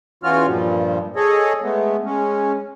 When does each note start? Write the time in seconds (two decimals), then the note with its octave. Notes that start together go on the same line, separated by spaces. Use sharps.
0.23 E2 E3 C#4 F4 F#4 F6
0.47 G2 A#2 F3 G3
1.16 G#4 A4 C#5 D#5
1.62 G#3 A3 B3
2.04 G#3 C#4